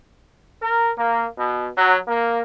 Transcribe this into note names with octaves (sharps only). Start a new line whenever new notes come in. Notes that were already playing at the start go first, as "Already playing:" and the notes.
A#4
A#3
B2
F#3
A#3